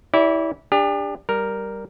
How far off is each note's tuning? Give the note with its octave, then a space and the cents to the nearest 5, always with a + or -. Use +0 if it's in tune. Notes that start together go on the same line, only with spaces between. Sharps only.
E4 -20 G4 +0 D5 -40
D4 +0 G4 +40
G3 +0 A#4 +0